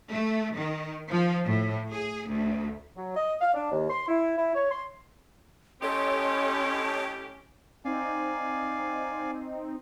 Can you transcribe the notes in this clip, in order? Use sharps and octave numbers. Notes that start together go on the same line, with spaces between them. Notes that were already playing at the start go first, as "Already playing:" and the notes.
A3
D#3
F3
A2
G#4
D2
F#3
D#5
F5
D4
D#2
C6
E4
E4
C#5
C6
A2 C#4 G4 A4 C#5 D#5 C6
C4 D#4 D5 F5 G#5